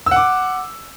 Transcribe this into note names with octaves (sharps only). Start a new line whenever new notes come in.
F#5 D6 E6